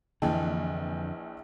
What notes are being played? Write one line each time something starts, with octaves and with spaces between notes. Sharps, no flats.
A#1 F2 D3 E3 D#5 G5 A5